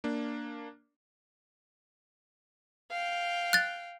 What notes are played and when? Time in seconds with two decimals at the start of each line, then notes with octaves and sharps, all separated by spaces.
0.04 A#3 D4
2.91 F5 G5
3.53 F#6 A6